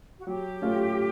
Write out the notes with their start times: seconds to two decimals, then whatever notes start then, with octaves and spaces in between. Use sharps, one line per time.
0.19 F#4
0.27 F#3 G4
0.62 A3 C#4 F4